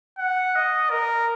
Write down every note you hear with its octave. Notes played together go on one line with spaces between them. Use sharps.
F#5
D#5
A#4